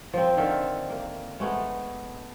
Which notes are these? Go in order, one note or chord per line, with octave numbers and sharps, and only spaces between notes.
F3 C4
D3 D#3 E5 F5
A#3
G#3 A3 B3